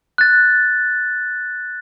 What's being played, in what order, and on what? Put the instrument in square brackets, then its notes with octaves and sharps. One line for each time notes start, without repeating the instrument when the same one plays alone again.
[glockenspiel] F#6 A6